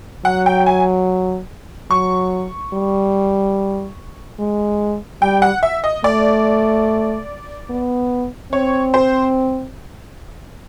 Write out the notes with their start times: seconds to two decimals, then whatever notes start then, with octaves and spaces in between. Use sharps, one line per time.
0.25 F#3 F#5
0.46 G5
0.66 G#5
1.91 F#3 C#6
2.73 G3
4.39 G#3
5.22 G3 G5
5.42 F#5
5.63 E5
5.84 D#5
6.04 A3 D5
7.70 B3
8.53 C4 C#5
8.94 C5